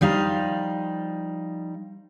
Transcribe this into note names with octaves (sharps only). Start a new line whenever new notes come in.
F3 G3 D#4 F5